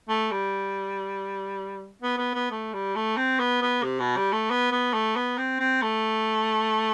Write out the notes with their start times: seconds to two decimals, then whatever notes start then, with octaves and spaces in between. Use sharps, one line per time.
0.09 A3
0.31 G3
2.02 B3
2.18 B3
2.34 B3
2.51 A3
2.73 G3
2.95 A3
3.17 C4
3.39 B3
3.62 B3
3.83 C3
4.00 B2
4.17 G3
4.32 A3
4.50 B3
4.72 B3
4.93 A3
5.16 B3
5.37 C4
5.60 C4
5.82 A3